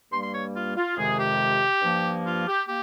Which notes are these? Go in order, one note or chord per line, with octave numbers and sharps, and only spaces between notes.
G2 G3 A#3 C6
C6
C#5
F4
F4
F2 C3 D#3 G#3 G#4
G4
G2 F3 A#3
F4
G4
A#3 G4